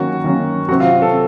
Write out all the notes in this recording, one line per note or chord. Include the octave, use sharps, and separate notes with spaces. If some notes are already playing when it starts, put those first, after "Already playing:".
Already playing: D#3 F#3 A#3 C#4 F#4
D#3 F#3 A#3 C#4
C3 F#3 C4 F#4
F4
A4